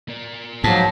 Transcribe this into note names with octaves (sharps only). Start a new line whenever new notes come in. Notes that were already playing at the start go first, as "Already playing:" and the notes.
A#3 D5
G#2 F3 F#3 A5